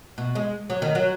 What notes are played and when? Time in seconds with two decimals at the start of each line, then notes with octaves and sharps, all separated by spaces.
0.18 B2
0.35 G#3
0.70 F#3
0.82 D#3
0.95 F#3